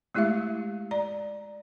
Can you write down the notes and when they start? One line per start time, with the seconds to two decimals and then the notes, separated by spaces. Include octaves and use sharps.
0.15 G#3 A3 E4 G4 E5 F5
0.91 D5 A#5